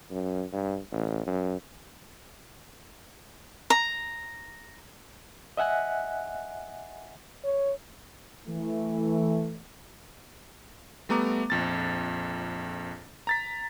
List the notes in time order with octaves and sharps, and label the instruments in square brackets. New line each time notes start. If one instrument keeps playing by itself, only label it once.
[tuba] F#2
G2
A1
F#2
[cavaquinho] A#5
[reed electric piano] D#5 E5 F#5 G#5 F#6
[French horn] C#5
[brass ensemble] E3 A3
[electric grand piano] G3 A3 B3 A#5 D6
A#1 F2 A6
A#5 A6 B6